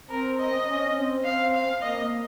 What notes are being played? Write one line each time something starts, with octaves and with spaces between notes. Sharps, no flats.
C4 A#4
D#5
C#4
C4
C4 F5
F5
A#3 D#5